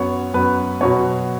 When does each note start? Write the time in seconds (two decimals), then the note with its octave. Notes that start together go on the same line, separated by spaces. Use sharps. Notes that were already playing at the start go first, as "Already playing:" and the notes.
Already playing: F#2 F#3 B3 C#5
0.34 F#2 F#3 B3 B4
0.81 B2 F#3 B3 C#5